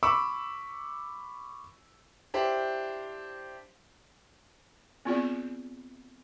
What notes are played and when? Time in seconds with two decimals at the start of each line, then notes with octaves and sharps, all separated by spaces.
0.03 B5 C#6 D6 E6
2.34 D4 E4 G4 C5
5.05 B3 C4 F4 G#4 D5